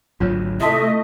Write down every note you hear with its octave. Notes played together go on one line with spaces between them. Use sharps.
G#1 D2 F#3 F4 C#5
C3 A3 E4 F#4 D#5 E5 A5